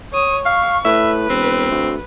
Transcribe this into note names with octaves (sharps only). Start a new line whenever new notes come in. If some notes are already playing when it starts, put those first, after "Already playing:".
C#5 D#6
F5 C#6
A2 B4 E5
E1 C4
D2